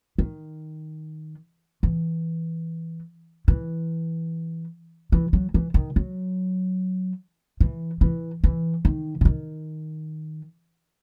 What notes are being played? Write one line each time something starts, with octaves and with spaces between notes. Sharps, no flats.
D#3
E3
E3
E3
F#3
E3
D#3
F#3
E3
E3
E3
D#3
C#3
D#3